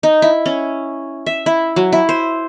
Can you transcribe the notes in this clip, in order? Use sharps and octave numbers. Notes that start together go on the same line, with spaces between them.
D#4
E4
C#4
E5
E4
F#3
E4
C5